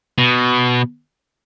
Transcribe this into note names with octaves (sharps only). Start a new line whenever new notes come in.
B2